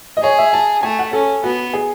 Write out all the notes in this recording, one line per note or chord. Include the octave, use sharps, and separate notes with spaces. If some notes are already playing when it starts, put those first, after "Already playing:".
D#5
G#4 C#5
E5
A5
A3 G#5
F#5
C#4 A4
B3 F#4
G#4